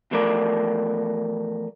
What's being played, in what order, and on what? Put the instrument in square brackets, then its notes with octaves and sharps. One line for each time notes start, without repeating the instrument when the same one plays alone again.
[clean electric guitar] E2 F3 A3 A#4 D5